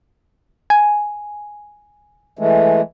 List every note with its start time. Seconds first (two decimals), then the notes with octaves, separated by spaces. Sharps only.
0.70 G#5
2.39 E3 G#3 A3